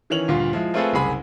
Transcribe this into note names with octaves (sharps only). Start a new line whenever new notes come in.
D#3 E3 C#4 F7 F#7
D2 G2 A#2 F4
F3 G#3 E4
A3 C4 F4 G#4 A4 B4
F#1 C2 C3 G#4 B5